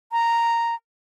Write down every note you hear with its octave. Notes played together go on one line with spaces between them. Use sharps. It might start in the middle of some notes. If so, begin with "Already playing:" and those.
A#5